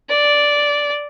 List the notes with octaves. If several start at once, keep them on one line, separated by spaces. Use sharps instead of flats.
D5